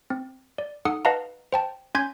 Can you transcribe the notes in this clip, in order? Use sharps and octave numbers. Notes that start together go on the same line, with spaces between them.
C4
D5
D#4 A4 F#5 D#6 C#7
B4 D#5 F5 F#5 A5 A#5
C5 G5 A5
C#4 G#5 C6 G6 G#6 B6